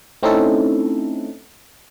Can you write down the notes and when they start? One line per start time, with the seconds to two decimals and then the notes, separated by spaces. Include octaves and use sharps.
0.23 A3 C4 C#4 D#4 E4 A4